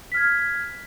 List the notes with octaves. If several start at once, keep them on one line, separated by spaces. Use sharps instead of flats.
F6 G#6 B6